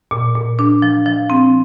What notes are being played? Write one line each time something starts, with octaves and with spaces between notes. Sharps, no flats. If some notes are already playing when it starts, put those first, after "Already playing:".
A#2
A#2
D4
F3
F3
C4